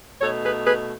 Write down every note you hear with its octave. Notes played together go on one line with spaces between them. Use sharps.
B2 A3 D#4 A4 C#5
G#4 B4
G#4 B4